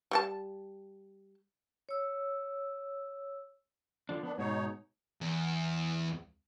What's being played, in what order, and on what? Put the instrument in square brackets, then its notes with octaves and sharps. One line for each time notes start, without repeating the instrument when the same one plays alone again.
[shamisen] G3 G4 A5
[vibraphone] C#5 E6
[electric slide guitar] D3 F3 D4
[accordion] D#3 D4 [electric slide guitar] B3
[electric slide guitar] G#2 B2 [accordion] D#4 C#5
[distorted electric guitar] E2